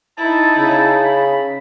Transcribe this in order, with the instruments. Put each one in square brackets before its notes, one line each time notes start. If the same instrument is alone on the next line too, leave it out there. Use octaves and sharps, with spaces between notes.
[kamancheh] D#4 E4 [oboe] A5
[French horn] C#3 [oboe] A5
[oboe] B5